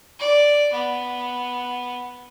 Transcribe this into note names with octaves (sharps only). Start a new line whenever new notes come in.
D5
B3